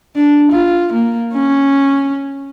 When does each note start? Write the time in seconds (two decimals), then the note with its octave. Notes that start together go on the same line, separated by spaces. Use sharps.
0.16 D4
0.52 F4
0.93 A#3
1.34 C#4